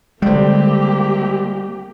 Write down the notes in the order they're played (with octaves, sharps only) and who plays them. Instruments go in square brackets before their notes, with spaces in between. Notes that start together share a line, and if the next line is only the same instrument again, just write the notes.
[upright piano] C#2 C4 [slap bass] D3 G#3 [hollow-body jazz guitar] G3 [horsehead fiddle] A#3 G4